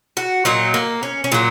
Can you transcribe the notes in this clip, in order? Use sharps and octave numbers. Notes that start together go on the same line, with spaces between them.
F#4
A#2 F#3 D#4
A#3
C#4
C#4
A#2 F#3 A#3